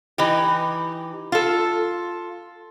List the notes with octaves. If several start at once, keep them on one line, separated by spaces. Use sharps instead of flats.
E3 D#4 G4
F4 A4